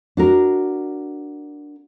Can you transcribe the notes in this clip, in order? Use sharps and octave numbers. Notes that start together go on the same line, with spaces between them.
D4 F#4 A#4